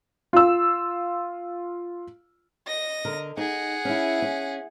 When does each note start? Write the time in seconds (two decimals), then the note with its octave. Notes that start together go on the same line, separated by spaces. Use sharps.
0.33 F4 E6
2.67 D#5 A#6
3.05 D3 A#4
3.37 D#4 G#4 F#5
3.85 C#4 E4
4.22 C#4